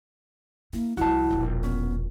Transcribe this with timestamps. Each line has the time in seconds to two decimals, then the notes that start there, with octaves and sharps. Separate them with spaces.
0.73 A#3 E4
0.97 C2 F3 E4 F#4 A5
1.31 E1 A#1
1.63 B3 C#4